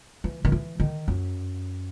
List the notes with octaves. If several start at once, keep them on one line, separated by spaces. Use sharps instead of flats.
E3
D#3
E3
D#3
F#2